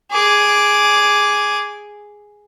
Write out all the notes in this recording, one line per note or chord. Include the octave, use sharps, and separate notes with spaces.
G#4 D6